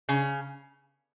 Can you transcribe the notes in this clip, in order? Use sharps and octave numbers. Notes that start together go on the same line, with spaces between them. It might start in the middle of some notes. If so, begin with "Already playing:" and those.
C#3